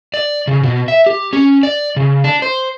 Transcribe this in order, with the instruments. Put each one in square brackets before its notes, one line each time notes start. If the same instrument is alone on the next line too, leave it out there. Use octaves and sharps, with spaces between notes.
[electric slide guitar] D5
C#3
B2
E5
G4
C#4
D5
C#3
D4
C5